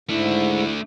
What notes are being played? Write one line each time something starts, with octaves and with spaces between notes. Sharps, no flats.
G#2 A3 D4 E4